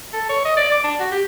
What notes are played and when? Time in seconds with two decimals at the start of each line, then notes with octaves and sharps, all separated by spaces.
0.13 A4
0.30 C#5
0.45 D#5
0.57 D5
0.72 D6
0.84 D4
1.00 F#4
1.12 G4